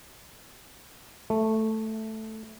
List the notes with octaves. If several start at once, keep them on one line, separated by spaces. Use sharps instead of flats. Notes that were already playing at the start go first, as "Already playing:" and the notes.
A3